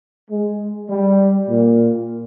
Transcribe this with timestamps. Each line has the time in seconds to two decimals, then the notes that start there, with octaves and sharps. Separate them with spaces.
0.30 G#3
0.90 G3
1.49 A#2